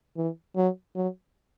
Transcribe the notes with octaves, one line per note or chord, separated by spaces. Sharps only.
E3
F#3
F#3